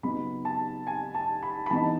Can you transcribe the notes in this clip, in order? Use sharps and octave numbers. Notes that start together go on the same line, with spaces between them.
C#3 F#3 B3 D#4 B5
A5
G#5
A5
B5
B5
E3 B3 D#4 A5